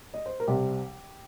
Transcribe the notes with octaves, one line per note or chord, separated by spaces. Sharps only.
D#5
C5
A#4
C2 C3 G3 C4 G4